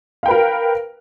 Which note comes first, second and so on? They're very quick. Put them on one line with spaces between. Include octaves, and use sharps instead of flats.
F5 G5 B4 A#4